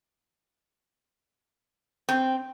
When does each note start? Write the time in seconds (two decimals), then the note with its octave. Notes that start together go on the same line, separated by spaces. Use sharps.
2.09 C4